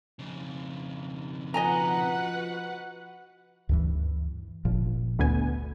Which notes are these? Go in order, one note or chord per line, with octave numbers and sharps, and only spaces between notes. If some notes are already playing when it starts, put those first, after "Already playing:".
F2 C#3
F3 F#4 B4 D#5 F#5 G#5 A#5
D2 G2 E3
G1 A#2 F3
D2 B3 G#5